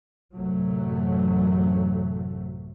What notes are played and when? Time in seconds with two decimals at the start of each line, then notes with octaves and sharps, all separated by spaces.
0.35 A1 F#2 C3 F#3 A3